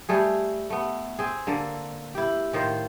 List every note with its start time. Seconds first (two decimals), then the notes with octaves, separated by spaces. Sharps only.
0.09 G3 A3 G#4
0.70 A3 B3
1.19 C4 G#4
1.47 D3 A#3 A4
2.15 E4 G4
2.53 A2 D#3 F4 C5